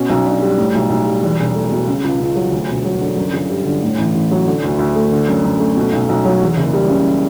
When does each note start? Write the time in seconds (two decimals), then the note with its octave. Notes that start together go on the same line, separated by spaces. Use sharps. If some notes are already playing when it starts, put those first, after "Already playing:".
Already playing: B2 C#4
0.10 B1
0.26 D4
0.41 G3
0.58 A2
0.75 B1
0.90 B1
1.06 G3
1.23 E2
1.40 E1
1.55 A3
1.72 B2
1.88 C#3
2.04 C#2
2.20 C#2
2.36 F#3
2.52 D2
2.69 E1
2.85 F#3
3.01 D3
3.17 F#2
3.34 G1
3.50 G3
3.66 D3
3.83 A2
3.98 A1
4.15 A1
4.31 F#3
4.47 D3
4.64 D2
4.79 D2
4.96 A3
5.12 D3
5.28 F#2
5.45 F#2
5.60 A3
5.77 B2
5.93 B1
6.09 B1
6.25 F#3
6.42 E2
6.57 F#1
6.73 G3
6.89 C#3